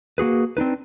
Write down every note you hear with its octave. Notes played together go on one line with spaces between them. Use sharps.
A#3 F#4 G#4 B4
C4 D4 D#4 B4